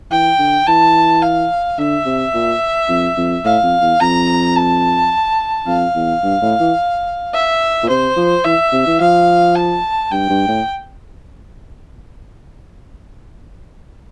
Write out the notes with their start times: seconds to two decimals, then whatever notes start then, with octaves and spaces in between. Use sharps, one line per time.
0.11 E3 G5
0.39 D3
0.67 E3 A5
1.22 F5
1.78 D3 E5
2.05 C3
2.34 A#2
2.89 F2
3.17 F2
3.45 A2 F5
3.63 F2
3.81 E2
4.00 F2 A#5
4.56 A5
5.66 F2 F5
5.95 E2
6.23 G2
6.41 A2
6.59 E3
7.34 E5
7.83 A#2
7.89 C3 C5
8.16 F3
8.45 E3 E5
8.72 C3
8.86 E3
9.00 F3 F5
9.56 A5
10.12 G2 G5
10.30 G2
10.48 A2